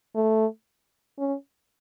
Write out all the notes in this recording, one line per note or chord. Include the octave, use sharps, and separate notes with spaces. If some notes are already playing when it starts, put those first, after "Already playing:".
A3
C#4